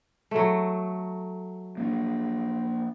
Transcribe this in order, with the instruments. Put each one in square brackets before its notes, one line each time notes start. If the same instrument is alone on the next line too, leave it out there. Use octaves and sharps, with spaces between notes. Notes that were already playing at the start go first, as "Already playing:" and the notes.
[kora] F#3 A3
[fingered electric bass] A#3 C4 D4